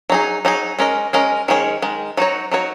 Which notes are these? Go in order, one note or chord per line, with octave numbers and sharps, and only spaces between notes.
F#3 D#4 G#4
F#3 D#4 G#4
G#3 C#4 A#4 D#5
G#3 C#4 A#4 D#5
D#3 G#3 C#4 G#4 C#5
D#3 G#3
F#3 D#4 F#4 C#5
F#3 D#4 F#4 C#5